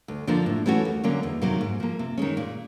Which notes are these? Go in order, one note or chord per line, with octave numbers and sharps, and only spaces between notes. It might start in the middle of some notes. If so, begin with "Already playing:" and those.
D2
D3 F3 A#3 D4
A2
E3 A3 C#4 F#4
D#2
D3 F#3 A#3 C#4
E2
C3 D#3 F#3 A#3
G#2
F3 A#3
C3
D#3 G#3 C#4
A#2